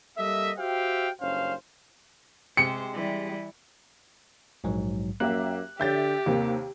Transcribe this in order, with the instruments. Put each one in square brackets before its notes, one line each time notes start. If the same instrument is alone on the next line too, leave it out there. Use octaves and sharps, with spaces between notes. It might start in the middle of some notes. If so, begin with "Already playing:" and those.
[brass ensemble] G3 A#3 A4 D#5 E5
F#4 G4 C5 E5 F5 G5
F#1 G2 C#4 C5 F5
[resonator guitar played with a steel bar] C3 G#3 G4 [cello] C5 [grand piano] C#7
[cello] E3 G3
[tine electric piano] A#1 G#2 F#3
[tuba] F#2 [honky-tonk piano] A#3 G4 E5 [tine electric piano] F#6
[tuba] D3 [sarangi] G4 [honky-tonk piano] E5 G6 A6
[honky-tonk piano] D#2 C3 [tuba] A#3